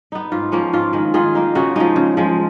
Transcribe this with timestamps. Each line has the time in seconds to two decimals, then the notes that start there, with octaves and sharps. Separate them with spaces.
0.12 B3 D#4
0.32 G#2 F4
0.52 F3 A#3 C#4
0.73 G#2 F4
0.93 D#3 G#3
1.14 D#3 F4 G#4
1.35 A#3 D#4
1.55 C#3 D#4 F#4
1.76 F3 G#3 D#4
1.96 C#3
2.17 F3 G#3